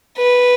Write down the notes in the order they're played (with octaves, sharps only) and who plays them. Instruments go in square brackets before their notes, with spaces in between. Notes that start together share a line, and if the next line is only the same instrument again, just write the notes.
[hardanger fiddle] B4